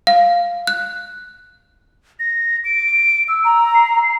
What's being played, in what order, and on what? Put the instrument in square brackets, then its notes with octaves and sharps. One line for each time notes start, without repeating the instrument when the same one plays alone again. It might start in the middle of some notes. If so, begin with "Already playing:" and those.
[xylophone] F5
F#6
[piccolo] A#6
D7
E6
[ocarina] A#5
[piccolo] C7